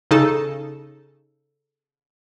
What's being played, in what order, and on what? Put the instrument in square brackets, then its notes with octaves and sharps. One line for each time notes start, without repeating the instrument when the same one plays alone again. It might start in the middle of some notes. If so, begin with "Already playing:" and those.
[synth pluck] C#3 D#4 A4